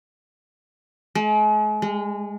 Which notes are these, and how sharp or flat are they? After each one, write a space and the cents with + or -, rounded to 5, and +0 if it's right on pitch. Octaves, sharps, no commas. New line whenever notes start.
G#3 +40
G#3 -25